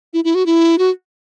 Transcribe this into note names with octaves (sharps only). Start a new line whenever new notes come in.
E4
E4
F#4
E4
F#4